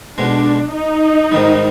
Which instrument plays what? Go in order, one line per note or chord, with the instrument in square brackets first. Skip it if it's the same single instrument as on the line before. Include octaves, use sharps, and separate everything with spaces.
[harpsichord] B1 B2 G#3 [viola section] D4
[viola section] D#4
[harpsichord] G#2 D#3 G3